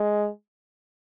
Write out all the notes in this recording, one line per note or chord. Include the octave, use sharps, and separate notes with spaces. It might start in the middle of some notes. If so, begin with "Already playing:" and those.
Already playing: G#3